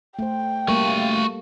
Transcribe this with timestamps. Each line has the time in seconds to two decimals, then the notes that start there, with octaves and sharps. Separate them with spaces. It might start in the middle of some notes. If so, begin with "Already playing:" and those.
0.19 A3 C5 G5
0.68 G3 A3 A#3 F#4 A4 F5